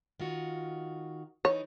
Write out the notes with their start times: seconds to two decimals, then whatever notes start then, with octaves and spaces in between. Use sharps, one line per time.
0.20 D#3 F4 F#4
1.45 E3 D#4 C#5